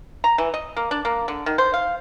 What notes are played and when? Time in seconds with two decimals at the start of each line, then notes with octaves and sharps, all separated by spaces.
0.24 A#5
0.38 E3
0.54 D#5
0.76 A#3
0.91 D4
1.05 A#3
1.28 D3
1.46 D#3
1.58 C5
1.74 F5